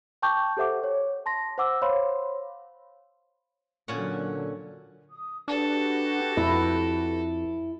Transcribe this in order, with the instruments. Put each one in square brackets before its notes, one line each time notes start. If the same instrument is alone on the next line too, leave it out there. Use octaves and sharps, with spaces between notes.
[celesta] G5 A5 C#6 D6 G6
G4 A4 C5 E5 F#5 D6
C#5
A5 C6 A#6
C5 F#5 D6 E6
C5 C#5 F5 B5 C6
[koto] A#2 C#4 F#5 [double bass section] D3 F#3
[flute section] D#6
[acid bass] D4 [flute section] F#4 G4 B4 [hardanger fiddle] A4
[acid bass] F2 [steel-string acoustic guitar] E4